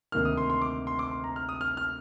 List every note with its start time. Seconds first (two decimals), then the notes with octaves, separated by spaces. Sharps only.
0.12 D2 C3 D#3 A#3 F6
0.25 D#6
0.37 C6
0.50 C6
0.62 D6
0.87 C6
0.99 D6
1.11 C6
1.24 A#5
1.36 F6
1.49 D#6
1.61 F6
1.77 F6